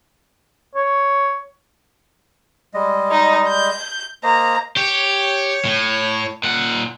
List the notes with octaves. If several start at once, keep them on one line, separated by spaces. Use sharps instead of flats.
C#5
G3 G#3 D#5
D#4
G6
A#3 C5 D#5 A#5
G4 C#5
A2
A#2 F#5